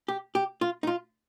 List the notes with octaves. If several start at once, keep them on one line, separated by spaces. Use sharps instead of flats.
G4
G4
F4
D#4
F4